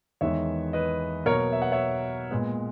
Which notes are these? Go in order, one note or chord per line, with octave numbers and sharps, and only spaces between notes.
E2 D#3 G#3 B3 C#5 E5
B4 D#5
B2 F#3 A#3 A#4 C#5
E5
F#5
C#5 E5
A#2 G#3 B3